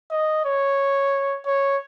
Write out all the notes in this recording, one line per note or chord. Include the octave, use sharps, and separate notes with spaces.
D#5
C#5
C#5